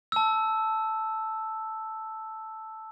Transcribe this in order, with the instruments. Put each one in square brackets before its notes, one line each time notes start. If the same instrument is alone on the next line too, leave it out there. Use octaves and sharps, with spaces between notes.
[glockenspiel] A5 E6